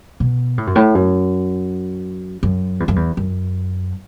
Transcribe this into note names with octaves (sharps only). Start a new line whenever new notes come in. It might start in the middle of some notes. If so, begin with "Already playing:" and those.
B2
A2
F#2
A2
F#2
F#2
E2
F#2
E2
F#2